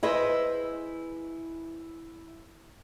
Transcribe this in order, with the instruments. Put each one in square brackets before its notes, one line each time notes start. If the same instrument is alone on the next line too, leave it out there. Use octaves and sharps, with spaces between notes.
[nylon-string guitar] E4 G#4 B4 C5 D#5 E5